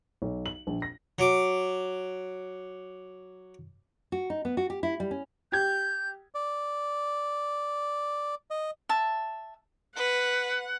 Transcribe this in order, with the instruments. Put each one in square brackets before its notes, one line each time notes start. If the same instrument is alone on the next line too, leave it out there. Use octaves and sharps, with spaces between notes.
[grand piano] B1
F#7
A#1
A#6
[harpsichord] F#3 D6
[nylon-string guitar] F#4
D#4
B3
F#4
G4
E4
G3
C#4
[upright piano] G4 G#6 [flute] G6
[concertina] D5
D#5
[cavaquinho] E5 A5
[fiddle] B4 [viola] F#5